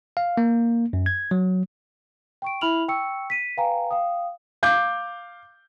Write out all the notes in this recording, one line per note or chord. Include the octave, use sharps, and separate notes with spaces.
F5
A#3
F#2
G#6
F#3
G5 C#6 D7
E4 E5 B5 F6 F7 F#7
G5 C#6 E6 C#7
B6 D#7
B4 F5 G5 G#5 A#5
F5 G5 D#6
F5 D6 G6